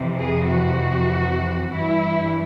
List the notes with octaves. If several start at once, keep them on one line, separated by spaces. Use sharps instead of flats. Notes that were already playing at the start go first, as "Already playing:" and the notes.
Already playing: F2 C3 E3
G#4
F#4
G2 E3 E4